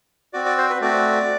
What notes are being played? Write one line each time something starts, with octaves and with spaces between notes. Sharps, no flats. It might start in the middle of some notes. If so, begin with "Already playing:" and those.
C4 F#4 D5
D5
C5
B4
A3 C4 F#4 D5